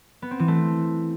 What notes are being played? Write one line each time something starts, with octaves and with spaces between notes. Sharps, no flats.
B3
C4
E3
A3